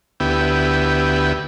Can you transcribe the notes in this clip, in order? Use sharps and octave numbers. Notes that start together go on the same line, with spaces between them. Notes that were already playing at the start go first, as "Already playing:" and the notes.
D2 B3 E4 G4